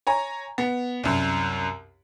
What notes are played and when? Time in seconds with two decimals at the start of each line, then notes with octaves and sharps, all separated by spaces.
0.07 C#5 G#5 A#5
0.58 B3
1.04 C2 F#2